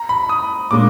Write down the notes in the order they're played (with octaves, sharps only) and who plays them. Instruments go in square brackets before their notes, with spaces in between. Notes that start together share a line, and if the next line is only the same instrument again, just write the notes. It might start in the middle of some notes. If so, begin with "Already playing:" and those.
Already playing: [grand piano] A#5
B5
D#6
[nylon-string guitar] A#2 G#3 D4 [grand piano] D6